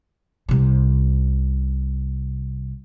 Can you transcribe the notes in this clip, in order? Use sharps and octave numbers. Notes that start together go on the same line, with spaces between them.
C2 C3